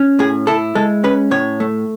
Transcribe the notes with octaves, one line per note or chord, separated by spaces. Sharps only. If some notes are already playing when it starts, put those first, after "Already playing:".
Already playing: C#4
A2 G#4
E4 A4
G#3 A4
C#4 B4
A2 C#5
A3